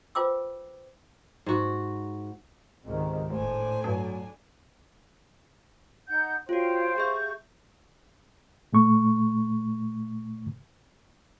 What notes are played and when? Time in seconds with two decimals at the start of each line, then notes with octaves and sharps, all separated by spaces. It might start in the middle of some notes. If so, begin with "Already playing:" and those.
0.15 F4 B4 C5 G5 D6 E6
1.46 G#2 F#4
2.84 C#2 G#2 C3 D#3
3.30 F1 A2 D4 C5 G#5
3.84 G2 F#3
6.07 D#4 F#5 G6
6.49 F4 F#4 C5 C#5 F5 G5
6.96 G4 G#4 E5 F5 C#6 G6
8.73 A#2 A3 C#6